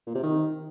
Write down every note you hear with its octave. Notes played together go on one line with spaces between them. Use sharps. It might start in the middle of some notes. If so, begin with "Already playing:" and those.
A#2
C3
D#3